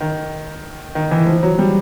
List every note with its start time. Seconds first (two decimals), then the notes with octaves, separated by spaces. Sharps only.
0.01 D#3
0.95 D#3
1.11 E3
1.27 F3
1.43 F#3
1.59 G3